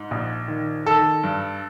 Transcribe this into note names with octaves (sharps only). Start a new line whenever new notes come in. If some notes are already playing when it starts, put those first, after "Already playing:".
Already playing: G#2
A#1
D#3
D#3 A4
G2